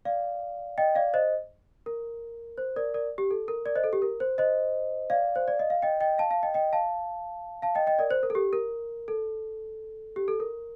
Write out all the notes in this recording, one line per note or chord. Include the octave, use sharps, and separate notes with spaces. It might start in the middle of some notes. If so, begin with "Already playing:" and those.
D5 F5
D#5 G5
D5 F5
C5 D#5
A#4
C5
A#4 D5
A#4 D5
G4
A4
A#4
A#4 D5
C5 D#5
A4
G4
A#4
C5
C5 D#5
D5 F5
C5
D5
D#5
F5
D#5 G5
D#5 G5
F5 A5
F5 A5
D#5 G5
D#5 G5
F5 A5
F5 A5
D#5 G5
D#5 G5
A#4 D5
C5
A#4
A4
G4
A#4
A4
G4
A4
A#4